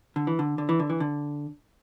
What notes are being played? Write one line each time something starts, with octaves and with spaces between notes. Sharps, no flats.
D3
E3
D3
D3
E3
D3
E3
D3